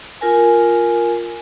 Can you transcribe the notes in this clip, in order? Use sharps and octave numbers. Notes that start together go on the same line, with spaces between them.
F4 A#4 G#5